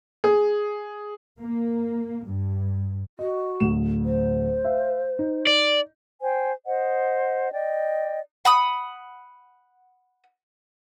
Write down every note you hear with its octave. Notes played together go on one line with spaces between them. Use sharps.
G#4
A#3
G2
F#4 D#5
D1 D2 E7
C5
E5 F5
D#4
D5
C5 G5 G#5
C5 D#5 F#5
D5 D#5 G5
F#5 B5 D#6